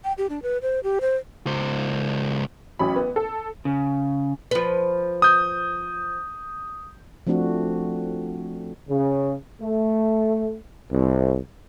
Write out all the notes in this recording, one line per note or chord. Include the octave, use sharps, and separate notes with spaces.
G5
G4
D4
B4
C5
G4
C5
C#2 C5
A1 F#3 C#4 B5
B3
A4
C#3
F3 B4
D#6 G6
F3 A3 C4 D4 F#4
C#3
A3
C2